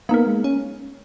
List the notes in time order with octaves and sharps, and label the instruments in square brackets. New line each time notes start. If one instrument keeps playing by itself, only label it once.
[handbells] A#3 D#4 A#4 [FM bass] B3
[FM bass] G#3
C#4